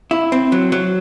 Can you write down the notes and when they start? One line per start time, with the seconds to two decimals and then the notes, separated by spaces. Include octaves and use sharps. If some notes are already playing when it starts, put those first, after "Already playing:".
0.11 E4
0.32 C4
0.52 F#3
0.72 F#3